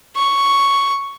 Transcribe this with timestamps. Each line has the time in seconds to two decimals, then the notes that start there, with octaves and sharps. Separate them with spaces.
0.16 C#6